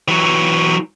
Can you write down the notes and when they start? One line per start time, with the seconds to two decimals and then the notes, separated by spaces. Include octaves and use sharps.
0.08 E3 F#3